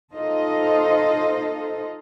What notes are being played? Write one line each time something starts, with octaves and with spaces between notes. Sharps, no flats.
D#4 F4 A4 C5 D#5